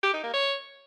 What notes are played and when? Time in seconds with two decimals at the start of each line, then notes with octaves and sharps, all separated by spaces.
0.03 G4
0.13 D#4
0.24 A#3
0.34 C#5